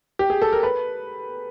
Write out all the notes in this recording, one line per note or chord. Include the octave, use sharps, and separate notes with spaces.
G4
G#4
A4
A#4
B4